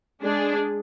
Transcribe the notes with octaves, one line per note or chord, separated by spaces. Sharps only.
G#3 D4 G#4